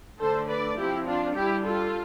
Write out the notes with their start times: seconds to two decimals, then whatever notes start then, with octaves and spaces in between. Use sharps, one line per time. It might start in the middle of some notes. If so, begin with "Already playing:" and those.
0.18 D3 A3 D4 A4 C5
0.48 B4 D5
0.76 F3 C4 E4 G4
1.06 D4 F4
1.35 G3 D4 E4 G4
1.65 F4 A4